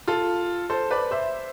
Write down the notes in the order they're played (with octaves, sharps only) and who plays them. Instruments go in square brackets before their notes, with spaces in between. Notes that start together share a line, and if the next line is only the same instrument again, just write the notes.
[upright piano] F4 A4
A4 C5
B4 D5
C5 E5